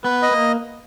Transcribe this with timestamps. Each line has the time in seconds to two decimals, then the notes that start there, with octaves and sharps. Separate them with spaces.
0.04 B3 B4
0.22 D#5
0.31 A#3